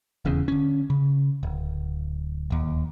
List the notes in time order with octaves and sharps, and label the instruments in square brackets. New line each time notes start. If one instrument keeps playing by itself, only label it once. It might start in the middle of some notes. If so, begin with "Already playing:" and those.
[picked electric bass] D#1 E2 C#3
D3 C#4
C#3
D1
D1 D#2